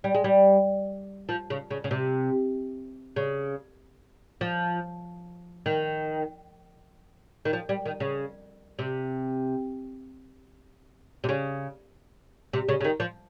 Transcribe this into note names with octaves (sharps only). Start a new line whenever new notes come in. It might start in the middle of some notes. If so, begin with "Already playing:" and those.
G3
G#3
G3
F3
C#3
C#3
C#3
C3
C#3
F3
D#3
D#3
F3
G3
D#3
C#3
C3
C3
C#3
C3
C#3
C#3
D#3
F3